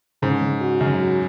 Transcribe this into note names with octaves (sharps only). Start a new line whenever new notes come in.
G#2 C#3
C#3
F#4
F#2 C#3
F#4